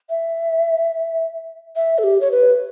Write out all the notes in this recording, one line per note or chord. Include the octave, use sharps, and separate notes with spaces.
E5
E5
A4
G4
C#5
B4